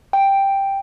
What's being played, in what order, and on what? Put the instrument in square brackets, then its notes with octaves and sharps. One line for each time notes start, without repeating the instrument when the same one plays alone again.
[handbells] G5